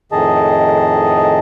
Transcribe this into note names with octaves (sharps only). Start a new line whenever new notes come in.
F2 A2 D#3 G#4 D#5 A5